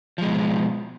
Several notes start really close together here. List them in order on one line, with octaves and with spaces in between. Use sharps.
F3 G#3 B2